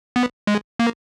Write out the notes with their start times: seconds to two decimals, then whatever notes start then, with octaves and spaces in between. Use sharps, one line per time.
0.16 B3
0.47 G#3
0.79 A#3